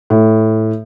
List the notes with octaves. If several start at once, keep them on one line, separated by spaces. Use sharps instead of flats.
A2